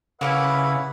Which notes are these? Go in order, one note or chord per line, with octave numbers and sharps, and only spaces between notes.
C#3 A#3 C#4 E4 B4 E5 F#5 B5